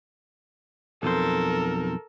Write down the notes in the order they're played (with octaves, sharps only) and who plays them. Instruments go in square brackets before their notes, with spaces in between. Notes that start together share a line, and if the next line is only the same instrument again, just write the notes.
[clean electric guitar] B1 F2 C5 [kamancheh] A4 A#4